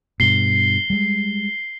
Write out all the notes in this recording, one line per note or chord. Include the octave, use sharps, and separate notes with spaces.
G2 B2 C7 G7
G3 G#3